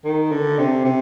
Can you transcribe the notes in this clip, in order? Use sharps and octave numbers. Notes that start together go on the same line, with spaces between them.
D#3
D3
C3
C3